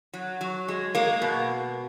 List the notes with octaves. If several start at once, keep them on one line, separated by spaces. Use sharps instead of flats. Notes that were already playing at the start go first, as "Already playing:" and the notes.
F#3
F#3
G#3
G#3 A#3
B2